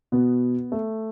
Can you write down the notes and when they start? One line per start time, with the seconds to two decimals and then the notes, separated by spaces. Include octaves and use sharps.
0.12 B2 B3
0.72 A3